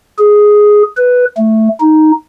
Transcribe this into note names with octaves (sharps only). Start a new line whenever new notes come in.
G#4
B4
A3
D#4